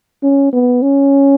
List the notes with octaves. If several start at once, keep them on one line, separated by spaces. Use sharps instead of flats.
C#4
B3
C#4